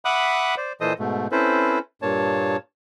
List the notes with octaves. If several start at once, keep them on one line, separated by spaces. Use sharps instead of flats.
E5 F#5 B5 D6 D#6 F#6
C5 D5
A#2 E3 A4 C5 D#5 D#6
G#2 B2 A3
C4 C#4 E4 A4 B4 C5
G2 A#2 A#3 C#5 A5